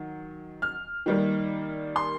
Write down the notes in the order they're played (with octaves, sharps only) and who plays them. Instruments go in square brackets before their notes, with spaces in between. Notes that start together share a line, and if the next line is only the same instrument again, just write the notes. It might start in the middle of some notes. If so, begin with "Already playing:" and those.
Already playing: [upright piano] D#3 F#3
F6
D#3 G3 A#3
C6